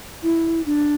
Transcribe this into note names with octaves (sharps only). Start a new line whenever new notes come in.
E4
D4